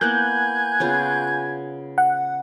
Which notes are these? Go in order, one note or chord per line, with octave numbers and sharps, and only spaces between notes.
A#3 B3 E4 G#5 F#6 G6
C#3 B3 F4
F#5